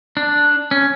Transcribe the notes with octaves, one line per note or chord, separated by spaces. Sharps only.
D4
C#4